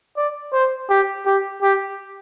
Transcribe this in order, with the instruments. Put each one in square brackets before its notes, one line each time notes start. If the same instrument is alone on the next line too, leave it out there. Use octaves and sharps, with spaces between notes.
[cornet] D5
C5
G4
G4
G4